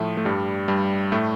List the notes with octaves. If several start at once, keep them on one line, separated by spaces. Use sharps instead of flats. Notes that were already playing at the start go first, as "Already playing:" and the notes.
Already playing: A2 F3 A3
A3
G2 G3
G2 G3
A2 A3